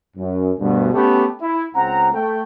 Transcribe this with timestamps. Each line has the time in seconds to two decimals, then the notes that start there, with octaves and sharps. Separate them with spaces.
0.17 F#2
0.59 D2 G2 B2
0.93 A3 B3 C#4 G4
1.40 E4
1.75 C#2 C4 F#5 A#5
2.13 A3 G5